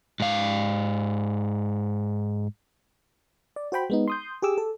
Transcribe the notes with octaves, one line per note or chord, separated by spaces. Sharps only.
G#2 F5
D5
F#4 C5 G5 B5
G#3 B3 D#4
C6 D#6 G6
G4 G#4 D6 E6
A4